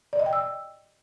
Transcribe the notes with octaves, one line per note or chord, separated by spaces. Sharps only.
D5
D#5
G5
E6